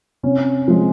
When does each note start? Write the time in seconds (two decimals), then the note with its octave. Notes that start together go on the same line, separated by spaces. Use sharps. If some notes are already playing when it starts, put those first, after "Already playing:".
0.23 C3 C#4
0.68 F3 G#3